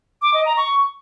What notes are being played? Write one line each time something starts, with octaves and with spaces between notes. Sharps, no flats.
D6
D#5
A#5
C#6